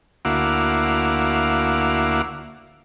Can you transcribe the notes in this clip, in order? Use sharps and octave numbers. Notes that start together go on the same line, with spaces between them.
D2 A#3 E4 F#4 F5 D6